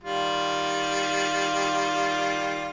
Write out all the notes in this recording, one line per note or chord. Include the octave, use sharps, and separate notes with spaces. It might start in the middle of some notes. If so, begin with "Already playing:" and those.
D#3 G3 F4